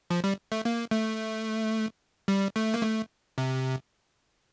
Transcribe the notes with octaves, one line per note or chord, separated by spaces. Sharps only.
F3
G3
A3
A#3
A3
G3
A3
A#3
A3
C3